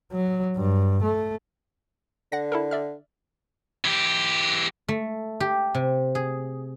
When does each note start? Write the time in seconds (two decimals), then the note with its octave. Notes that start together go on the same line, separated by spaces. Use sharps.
0.13 F#3
0.57 G2
1.03 A3
2.32 D3 F#5 A#6
2.52 E4 A4 A#4
2.71 D5 E5 F6
3.85 E3 G4
4.88 A3
5.40 G4
5.75 C3
6.15 G#4